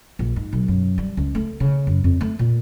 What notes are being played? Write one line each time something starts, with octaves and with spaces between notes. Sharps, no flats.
A#1
G#2
B1
F#2
G3
C#2
A3
C#3
F#2
F2
A3
A#2